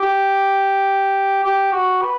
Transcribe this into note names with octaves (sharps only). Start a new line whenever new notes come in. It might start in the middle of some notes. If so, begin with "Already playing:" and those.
Already playing: G4
G4
F#4
B4